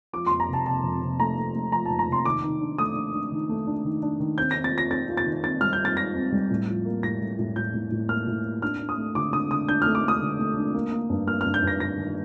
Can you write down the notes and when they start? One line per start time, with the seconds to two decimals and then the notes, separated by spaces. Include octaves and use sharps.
0.13 F3 D6
0.27 F2 C6
0.40 A#5
0.49 C3 A5
0.66 C3 A5
0.84 F2
1.02 C3
1.19 A3 A#5
1.37 A3
1.55 A3
1.72 F3 A#5
1.86 F2 A5
1.99 A#5
2.08 C3 C6
2.25 D#3 D6
2.43 D#3
2.61 D4
2.78 A3 D#6
2.96 D4
3.14 D4
3.32 D#3
3.49 A3
3.67 D4
3.85 D#3
4.02 D4
4.20 D#3
4.38 C4 G6
4.51 C4 A#6
4.64 A6
4.73 F4 A#6
4.91 C4 A6
5.09 F4
5.17 A6
5.26 D#3
5.44 C4 A6
5.61 G3 F6
5.73 G6
5.79 F4
5.85 A6
5.97 F4 A#6
6.15 C4
6.32 G3
6.50 A2
6.68 F3
6.85 A#3
7.03 A2 A#6
7.21 A2
7.39 A2
7.56 A2 G6
7.74 A2
7.91 A2
8.09 A#3 F6
8.27 A2
8.44 A#3
8.62 D4 F6
8.80 D4
8.89 D#6
8.98 A3
9.15 D3 D6
9.33 D3 D#6
9.51 D3 D#6
9.69 D4 G6
9.82 A3 F6
9.95 D6
10.04 A3 D#6
10.21 D3
10.39 A3
10.57 D4
10.74 A#3
10.92 A#3
11.10 G2
11.28 A#3 F6
11.41 G2 F6
11.54 G6
11.63 G2 A#6
11.80 G2 A#6
11.98 D#3